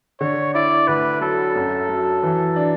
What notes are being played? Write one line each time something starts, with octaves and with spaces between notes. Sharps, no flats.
D3 C#5
E4 D5
D2 B4
F#3 A4
F#2
F#3
E3
D4